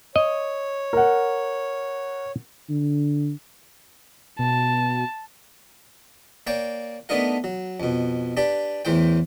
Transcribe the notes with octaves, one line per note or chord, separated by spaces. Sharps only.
C#5 D#5
A#4 F#5
D3
B2 A5
A#3 C#5 D5 G5
A3 B3 D4 D#4 A#4 F#5
F#3
F2 B2
D4 G4 B4 D5
E2 A2 E3 C5 G5